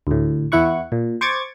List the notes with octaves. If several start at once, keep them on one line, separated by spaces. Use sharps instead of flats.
D2 A2
E2 E3 E4 F#5 C#6
A#2
C5 C#6 D6 G#6 A6